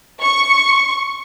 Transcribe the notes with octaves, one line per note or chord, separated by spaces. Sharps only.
C#6